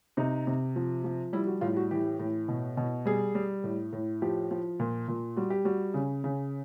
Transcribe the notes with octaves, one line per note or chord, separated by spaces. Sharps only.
C3 D#4
C3
F3
F3
G3 E4
F#4
A2 F4
F#4
E3 G4
A2
B2
B2
G3 G#4
G3
A2
A2
F3 G4
F3
A#2
A#2
G3 F#4
G4
G3 F#4
C#3
C#3